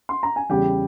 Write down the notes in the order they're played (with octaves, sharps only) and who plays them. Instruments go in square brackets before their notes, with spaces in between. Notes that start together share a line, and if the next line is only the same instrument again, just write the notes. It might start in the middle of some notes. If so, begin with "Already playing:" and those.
[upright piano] C6
A#5
G#5
E2 C#3 G3 G4 G5